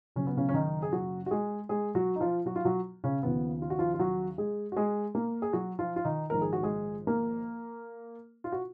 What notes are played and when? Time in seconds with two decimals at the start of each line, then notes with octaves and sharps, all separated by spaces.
0.16 F#1 F#2 C#3 F#3 C#4
0.27 B3
0.37 C#3 C#4
0.49 C#4
0.54 D#3 D#4
0.82 G#4
0.92 F#3 F#4
1.26 F#4
1.31 G#3 G#4
1.69 G#3 G#4
1.95 F#3 F#4
2.16 D#4
2.21 F3 F4
2.46 F#3 F#4
2.56 F4
2.65 F#3 F#4
3.04 C#3 C#4
3.23 D#2 C#3 F3 B3
3.62 F4
3.70 F#4
3.79 F3 F4
3.94 F4
3.99 F#3 F#4
4.38 G#3 G#4
4.72 F#4
4.76 G#3 G#4
5.15 A#3 A#4
5.42 G#4
5.53 F#3 F#4
5.79 F3 F4
5.96 F4
6.05 D#3 D#4
6.30 A#1 G#2 D#3 A#4
6.41 G#4
6.53 F#4
6.63 G#3 G#4
7.07 A#3 A#4
8.44 F4
8.52 F#4